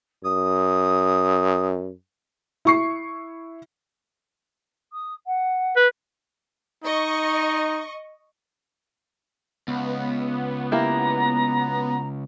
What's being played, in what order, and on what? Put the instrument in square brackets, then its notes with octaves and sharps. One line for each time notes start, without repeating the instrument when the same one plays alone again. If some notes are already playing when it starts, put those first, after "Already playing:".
[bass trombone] F#2 [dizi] D#6
[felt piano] E4 C#6 C7
[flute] D#6
F#5
[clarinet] B4
[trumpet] D#4 [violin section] D#5 C#6
[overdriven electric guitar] C#2 [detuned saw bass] B3
[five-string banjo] A#3 E4 G4 [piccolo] A#5